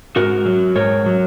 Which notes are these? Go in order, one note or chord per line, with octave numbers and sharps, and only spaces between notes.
G#2 F#4 A#4
F#3
G#2 A#4 C#5
F#3